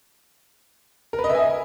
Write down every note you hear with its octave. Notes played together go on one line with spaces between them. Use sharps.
A#4
B4
D#5
E5
G#5